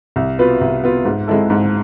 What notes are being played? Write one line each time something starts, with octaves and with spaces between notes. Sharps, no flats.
C2
B2 B3 F4 B4
C2
B2 B3 F4 B4
G#2
G#3 C4 E4 A4
G#2